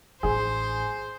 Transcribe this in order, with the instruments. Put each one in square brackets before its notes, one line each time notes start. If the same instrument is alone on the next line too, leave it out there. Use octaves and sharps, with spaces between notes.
[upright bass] A1 D#4 [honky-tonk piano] G#4 [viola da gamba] C5